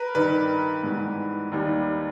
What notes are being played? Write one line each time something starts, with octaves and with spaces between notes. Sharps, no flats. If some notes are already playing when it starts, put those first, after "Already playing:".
Already playing: A#4 B4
G2 D#3 G3 B4
G#2 E3 G3 B3
D#2 D#3 G3